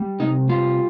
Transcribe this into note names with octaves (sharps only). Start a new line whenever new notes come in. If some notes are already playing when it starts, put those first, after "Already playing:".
Already playing: G3
C3 D#4
G3 F4